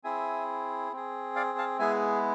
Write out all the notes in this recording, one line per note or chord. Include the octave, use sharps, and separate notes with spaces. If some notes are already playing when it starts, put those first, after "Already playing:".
C4 E4 G#4 E5 G#5
C4 G#4
D5 F5
F5 A5
G#3 B3 E4 G#4 E5 G#5